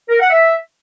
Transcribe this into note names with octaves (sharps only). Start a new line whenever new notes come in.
A#4
F#5
E5